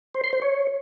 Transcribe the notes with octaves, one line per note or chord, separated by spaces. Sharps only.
C5
C6
C5
C#5